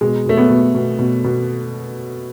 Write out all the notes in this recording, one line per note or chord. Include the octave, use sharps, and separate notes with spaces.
B2 G#3
B2 A3
B3
B2
B2
B2
B2